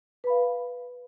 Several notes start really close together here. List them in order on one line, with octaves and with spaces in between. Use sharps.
B4 B5 F5